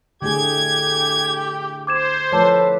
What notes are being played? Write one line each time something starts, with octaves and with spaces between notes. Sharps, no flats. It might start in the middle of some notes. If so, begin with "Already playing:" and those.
D3 A3 G4 G#4 G#6
C5 D6 G#6 E7
F3 A3 A4 B4 C#5 A5 D6